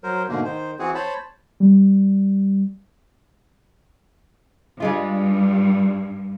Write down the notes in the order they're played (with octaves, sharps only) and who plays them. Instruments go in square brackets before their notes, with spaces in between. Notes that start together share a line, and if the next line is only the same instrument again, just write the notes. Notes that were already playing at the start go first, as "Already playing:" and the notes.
[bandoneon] F#3 A#4 C5
G#2 B2 D3 A3 A#3
D#3 C5
E3 C4 F#4 G#4
C5 C#5 A5 B5
[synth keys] G3
[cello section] G2 [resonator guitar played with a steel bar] G3 G#3 F4